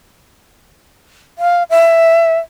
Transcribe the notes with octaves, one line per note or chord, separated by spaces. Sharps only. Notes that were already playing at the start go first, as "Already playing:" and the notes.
F5
E5